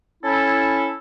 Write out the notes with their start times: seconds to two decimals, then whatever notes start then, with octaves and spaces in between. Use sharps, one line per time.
0.24 C#4 E4 A4